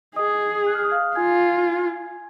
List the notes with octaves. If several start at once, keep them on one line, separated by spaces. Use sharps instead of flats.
G#4 D#5 D#6
F#6
F6
D#6
F5 F6
F4 G#5 G#6